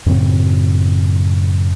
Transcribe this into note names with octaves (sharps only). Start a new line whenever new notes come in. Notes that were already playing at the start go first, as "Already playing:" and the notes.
F#2 A2 C#3 C4